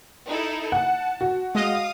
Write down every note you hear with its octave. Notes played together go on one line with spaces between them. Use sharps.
D#4 E4 A4
F#5 A5
F#4
G#3 D#5 F5 D#6